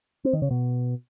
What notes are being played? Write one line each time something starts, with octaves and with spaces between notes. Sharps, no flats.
C4
D#3
C#3
B2